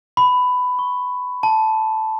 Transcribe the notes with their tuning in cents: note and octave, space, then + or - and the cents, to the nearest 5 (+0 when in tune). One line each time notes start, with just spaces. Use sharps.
B5 +15
C#6 -30
A5 -5